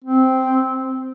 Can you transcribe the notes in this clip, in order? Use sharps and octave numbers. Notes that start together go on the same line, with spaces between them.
C4